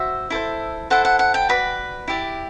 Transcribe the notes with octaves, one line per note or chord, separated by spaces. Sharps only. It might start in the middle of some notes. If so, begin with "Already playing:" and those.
Already playing: F#4 C5 E5
E4 A4 C5
E4 A4 C5 F#5
F#5
F#5
G5
F#4 B4 D5 B5
E4 G4 D5